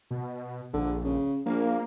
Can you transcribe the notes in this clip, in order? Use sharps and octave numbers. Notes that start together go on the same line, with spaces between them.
B2
A#1 D3
C#3
A#1 A#3